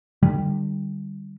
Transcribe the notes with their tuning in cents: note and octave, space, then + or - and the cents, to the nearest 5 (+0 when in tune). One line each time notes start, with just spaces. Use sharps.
D3 +40 G3 +0